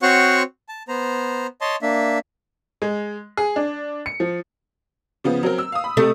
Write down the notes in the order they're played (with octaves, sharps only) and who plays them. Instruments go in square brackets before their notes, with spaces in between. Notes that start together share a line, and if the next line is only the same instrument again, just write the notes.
[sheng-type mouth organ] C4 F#4 C5 C#5 F#5 C#6
A5
B3 C5 A#5
C#5 D#5 A5 C6
A#3 D4 E5
[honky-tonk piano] G#3
G#4
D4
C#7
F3
C#3 F3 B3
F#3 C4 A#4
E6
F5 D#6
B5
[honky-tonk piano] C3 [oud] A3